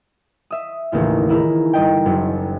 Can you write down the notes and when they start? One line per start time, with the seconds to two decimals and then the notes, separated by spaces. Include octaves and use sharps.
0.51 E5 D#6
0.92 A1 D#2 C#3 F4
1.29 D#4 E4 G#4 A#4
1.73 G1 D#5 G5
2.06 F#1 F#2